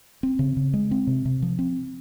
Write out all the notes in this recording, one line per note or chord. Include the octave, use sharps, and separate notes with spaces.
C4
C#3
C#3
G#3
C4
C3
C3
F3
C4